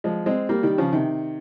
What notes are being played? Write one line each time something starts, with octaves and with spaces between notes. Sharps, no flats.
F3 G#3
G#3 C4
G3 A#3
D#3 G3
C#3 F3
C3 D#3